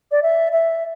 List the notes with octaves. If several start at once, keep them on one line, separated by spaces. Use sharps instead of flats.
D5
E5
E5